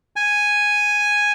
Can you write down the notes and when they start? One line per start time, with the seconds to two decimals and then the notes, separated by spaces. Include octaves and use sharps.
0.16 G#5